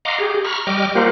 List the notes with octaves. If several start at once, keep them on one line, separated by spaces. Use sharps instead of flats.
D#5 F5 F#5 A#5 C6 D6
G4 G#4
A#5 B5 C#6 F6
G3 D#5 G5 D6 F6
A#3 F4 G4 A#4 C5 F#5